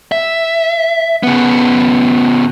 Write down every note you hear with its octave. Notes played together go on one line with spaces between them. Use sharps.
E5
C#3 B3